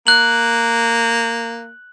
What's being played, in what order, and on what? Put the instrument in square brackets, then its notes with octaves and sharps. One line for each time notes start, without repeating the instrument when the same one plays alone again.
[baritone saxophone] A#3 [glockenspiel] F#6 F#7